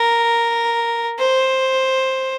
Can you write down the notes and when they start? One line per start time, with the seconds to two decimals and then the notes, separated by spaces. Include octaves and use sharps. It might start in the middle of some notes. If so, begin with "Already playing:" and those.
Already playing: A#4
1.19 C5